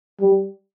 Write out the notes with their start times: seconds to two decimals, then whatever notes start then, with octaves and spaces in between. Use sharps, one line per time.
0.21 G3